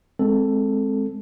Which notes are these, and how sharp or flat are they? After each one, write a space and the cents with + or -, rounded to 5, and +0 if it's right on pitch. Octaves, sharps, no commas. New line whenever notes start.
G#3 +0 C4 +0 A4 +0